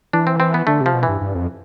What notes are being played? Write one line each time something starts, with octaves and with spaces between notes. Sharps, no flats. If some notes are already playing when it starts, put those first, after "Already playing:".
E3 D4
C4
C4
B3
D3 A3
C3
F3
B2
E3
G2
G2
F2